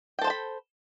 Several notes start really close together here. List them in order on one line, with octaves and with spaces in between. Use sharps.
G5 A4 C5 A5 B5